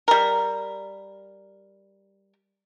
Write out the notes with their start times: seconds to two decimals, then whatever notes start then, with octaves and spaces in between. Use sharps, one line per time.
0.08 G3 A#4